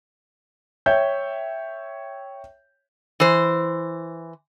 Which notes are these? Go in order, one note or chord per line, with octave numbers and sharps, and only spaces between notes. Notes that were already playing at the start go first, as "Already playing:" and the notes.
C#5 E5 G5 G6
E3 C5